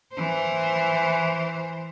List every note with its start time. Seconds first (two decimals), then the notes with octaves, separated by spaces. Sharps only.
0.14 E3 C5